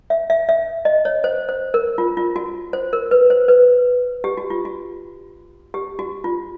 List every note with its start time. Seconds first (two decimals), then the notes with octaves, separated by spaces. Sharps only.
0.10 E5
0.30 E5
0.49 E5
0.85 D#5
1.05 C#5
1.24 C5
1.49 C5
1.74 A#4
1.98 F4
2.17 F4
2.36 F#4
2.73 C5
2.93 A#4
3.11 B4
3.30 C5
3.48 B4
4.24 G4
4.38 F#4
4.50 F4
4.65 F#4
5.74 G4
5.99 F#4
6.24 F4